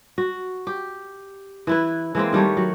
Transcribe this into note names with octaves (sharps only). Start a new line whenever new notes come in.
F#4
G4
E3 E4 B4
E3 G#3 A#3 C4
D#3 G3 A3 C#5
F#3